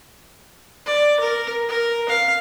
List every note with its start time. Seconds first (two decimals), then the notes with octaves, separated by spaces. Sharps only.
0.86 D5
1.20 A#4
1.69 A#4
2.09 F5